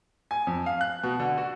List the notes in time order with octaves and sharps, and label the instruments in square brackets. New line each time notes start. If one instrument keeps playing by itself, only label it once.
[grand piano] G#5
F2
F5
F#6
B2
D3
F#4